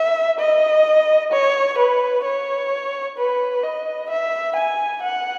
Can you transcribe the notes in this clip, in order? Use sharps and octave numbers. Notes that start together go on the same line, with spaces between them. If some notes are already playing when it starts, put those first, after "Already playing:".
Already playing: E5
D#5
C#5
B4
C#5
B4
D#5
E5
G#5
F#5